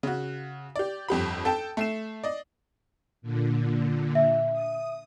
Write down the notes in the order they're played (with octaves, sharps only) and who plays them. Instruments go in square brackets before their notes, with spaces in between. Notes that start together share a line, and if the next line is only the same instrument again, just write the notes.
[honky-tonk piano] C#3 F#4
G4 D5
G1 F2 G4 B5
A4 G5 A5
A3 C7 E7
D5 D#5
[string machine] A#2 D3
[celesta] E5
[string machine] D#6